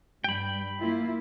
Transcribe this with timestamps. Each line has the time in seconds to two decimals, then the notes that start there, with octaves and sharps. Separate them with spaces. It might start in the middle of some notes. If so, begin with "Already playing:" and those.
0.24 G2 G3 G5 B5
0.79 A#3 E4 F4